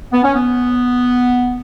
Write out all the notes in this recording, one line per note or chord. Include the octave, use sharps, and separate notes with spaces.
B3
C#4
B3